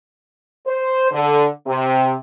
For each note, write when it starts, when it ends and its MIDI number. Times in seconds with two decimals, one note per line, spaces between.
0.66 1.10 72
1.12 1.47 50
1.67 2.12 48